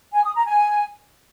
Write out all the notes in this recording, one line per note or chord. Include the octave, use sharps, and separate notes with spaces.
G#5
D#6
A#5
G#5